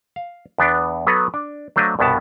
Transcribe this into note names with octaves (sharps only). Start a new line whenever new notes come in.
F5
E2 B3 D4
F#3 B3 A4 B4 A#5
D4
F#3 A3 D4 C5 D#5 F5
C2 G2 B2 B3 A5